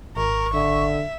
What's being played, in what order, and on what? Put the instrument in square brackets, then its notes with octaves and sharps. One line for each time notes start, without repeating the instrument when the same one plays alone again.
[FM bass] G#1 [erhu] A#4 [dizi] C#6
[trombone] D3 [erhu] E5